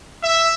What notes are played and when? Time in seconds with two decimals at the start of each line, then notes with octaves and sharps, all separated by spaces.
0.22 E5